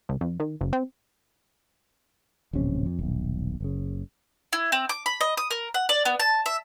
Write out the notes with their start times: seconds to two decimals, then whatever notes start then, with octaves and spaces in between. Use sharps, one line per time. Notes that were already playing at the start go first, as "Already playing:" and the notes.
0.09 C#2
0.21 F2
0.40 D#3
0.61 F#1
0.73 C4
2.53 D1 A#1 C3 C#4
2.86 F2
2.99 D#1 B1
3.60 F#1 C#3
4.53 E4
4.72 C4
4.89 D6
5.06 B5
5.21 D#5
5.37 D#6
5.51 A#4
5.74 F#5
5.89 D5
6.05 B3
6.20 A5
6.46 E5